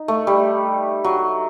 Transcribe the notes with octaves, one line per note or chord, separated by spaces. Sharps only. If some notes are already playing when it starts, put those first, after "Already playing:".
Already playing: D#4
A3
G3
F#3